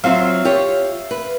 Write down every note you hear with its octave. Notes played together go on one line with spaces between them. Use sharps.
F#3 C4 F4 E5 F5
F4 G4 C#5
B4